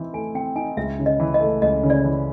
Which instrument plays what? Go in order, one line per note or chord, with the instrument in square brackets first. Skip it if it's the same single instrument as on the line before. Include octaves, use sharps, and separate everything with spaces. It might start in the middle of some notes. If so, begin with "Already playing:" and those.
Already playing: [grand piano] E3 C4 D#4
[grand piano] A3 [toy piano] G#5
[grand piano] C4 [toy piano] G5
[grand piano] D#4 [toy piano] G#5
[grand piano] C#2 [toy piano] E5
[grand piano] C#3
[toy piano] D#5
[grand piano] E3
[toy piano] D#5
[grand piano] A3
[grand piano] C#2 [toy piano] D#5
[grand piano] C#3
[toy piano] D5
[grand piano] E3